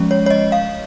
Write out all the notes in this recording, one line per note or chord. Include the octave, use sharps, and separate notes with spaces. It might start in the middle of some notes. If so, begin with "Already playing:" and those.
Already playing: F3 G#3 C#4
C#5
C#5
D#5
F5